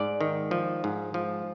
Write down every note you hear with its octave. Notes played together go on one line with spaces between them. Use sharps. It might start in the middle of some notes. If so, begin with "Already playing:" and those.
Already playing: G#2 D5
D#3
F3
G#2
F3